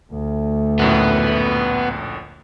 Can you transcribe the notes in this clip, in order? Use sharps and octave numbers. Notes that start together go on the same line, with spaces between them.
D2 A3
A#1 F#2 A2 B3